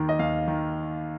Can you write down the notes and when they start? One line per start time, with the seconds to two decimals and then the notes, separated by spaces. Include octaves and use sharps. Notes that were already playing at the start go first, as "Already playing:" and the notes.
Already playing: D#2 D#3
0.09 D#5
0.19 D#2 F5
0.48 D#3